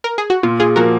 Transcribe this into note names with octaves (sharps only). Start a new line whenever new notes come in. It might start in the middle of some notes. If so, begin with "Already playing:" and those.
A#4
G#4
F#4
A#2 F4
F4 G#4
F3 A#3 F#4 A#4